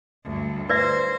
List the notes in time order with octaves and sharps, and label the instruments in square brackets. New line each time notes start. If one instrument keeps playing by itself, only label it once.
[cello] D2 G2
[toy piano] B4 D5 E5 [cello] C5